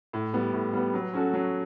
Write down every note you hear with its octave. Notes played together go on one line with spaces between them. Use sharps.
A2
G3 B3
A2
G3 B3
F#3
C#4 F#4 A4
F#3